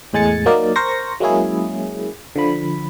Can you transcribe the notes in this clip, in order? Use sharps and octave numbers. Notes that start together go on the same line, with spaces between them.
E2 A2 G#3 G#5 A6 C#7
F#3 A#3 D#4 A#4 D5
A#4 C5 C#6 A#6
F#3 G#3 A#3 C#4 E4 G#4
D3 F3 B5